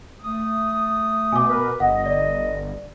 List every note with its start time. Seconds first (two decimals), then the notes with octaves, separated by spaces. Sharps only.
0.20 A3 D#6
1.32 B2 G#5 D6
1.48 A#4 B4
1.80 G1 D#5 F#5
2.06 D5